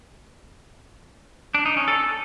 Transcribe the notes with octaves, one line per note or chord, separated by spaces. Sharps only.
D4
D#4
C#4
A4